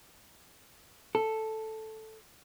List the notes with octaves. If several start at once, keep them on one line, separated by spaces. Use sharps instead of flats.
A4